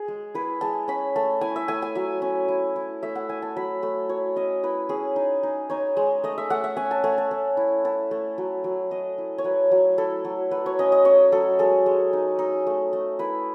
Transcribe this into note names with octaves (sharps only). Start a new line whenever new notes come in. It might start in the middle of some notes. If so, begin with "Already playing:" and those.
Already playing: G#4
G#3
E4 B4
G#3 A5
C#4 B5
A3 A5
E4 G#5
E5
A3 G#5
G#5
F#3 E5
C#4
E4
E4
A3 E5
F#5
E4 G#5
A5
F#3 B5
A3 B5
F#3 C#5
C#4 D#5
E4 B4
C#4 G#4
D#4
D#4
D#4 C#5
G#3
A3 D#5
E5
A3 F#5
E5
C#4 G#5
A5
A3 G#5
A5
C#4
E4
E4 A5
A3
F#3
F#3
F#3 D#5
E4
C#5
F#3 B4
F#3
E4 A4
F#3
F#3 B4
C#5
C#4 D#5
D#5
C#4 C#5
F#3 A4
G#3 A4
G#3
D#4
D#4
A3
A3
E4 B4